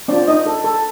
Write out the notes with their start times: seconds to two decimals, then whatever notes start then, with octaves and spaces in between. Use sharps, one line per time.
0.08 C4 D4 F4 D5
0.28 D#4 D#5
0.46 A4
0.64 A4